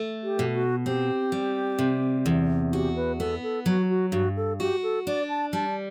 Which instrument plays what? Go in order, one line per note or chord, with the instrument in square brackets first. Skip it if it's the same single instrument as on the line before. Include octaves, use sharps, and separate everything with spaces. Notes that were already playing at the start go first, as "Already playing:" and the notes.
Already playing: [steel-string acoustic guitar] A3
[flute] G4
[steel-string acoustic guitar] B2
[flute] F#4
[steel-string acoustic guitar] C4 [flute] G4
[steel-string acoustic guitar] G3
C3
E2
[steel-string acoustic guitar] F#4 [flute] G4
[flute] B4
[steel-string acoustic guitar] B3 [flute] A4
[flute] A4
[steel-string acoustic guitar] F#3 [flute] F#4
[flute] F#4
[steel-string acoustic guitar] G2 [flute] F#4
[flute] A4
[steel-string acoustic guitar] F#4 [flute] G4
[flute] A4
[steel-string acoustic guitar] D4 [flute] D5
[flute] A5
[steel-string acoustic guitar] G3 [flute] A5